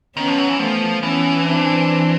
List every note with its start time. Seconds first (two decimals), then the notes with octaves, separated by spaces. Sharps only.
0.16 D#3 B3 C#4
0.28 F3
0.38 F#3
0.49 E3
0.59 F3 A3 B3
1.03 E3 B3 C#4
1.46 C4 D4